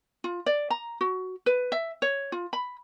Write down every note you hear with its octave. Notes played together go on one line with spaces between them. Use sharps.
F4
D5
A#5
F#4
B4
E5
C#5
F4
B5